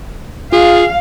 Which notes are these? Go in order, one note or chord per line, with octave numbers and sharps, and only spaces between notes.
F4 G#4 F5